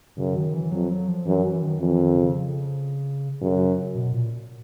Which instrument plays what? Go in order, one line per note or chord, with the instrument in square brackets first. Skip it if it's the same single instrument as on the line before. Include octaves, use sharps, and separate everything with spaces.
[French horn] F#2 [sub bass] C#3
[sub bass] D#3
E3
[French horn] F2 [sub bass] F#3
[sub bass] F#3
F3
[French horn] F#2 [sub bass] E3
[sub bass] E3
D#3
[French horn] F2 [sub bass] E3
[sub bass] D#3
C#3
[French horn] F#2 [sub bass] C#3
[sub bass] B2
A#2